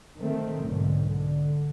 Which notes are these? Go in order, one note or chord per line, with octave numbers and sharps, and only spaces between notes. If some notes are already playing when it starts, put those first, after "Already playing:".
D#3 A3 C4
B1 G#2 D3
D3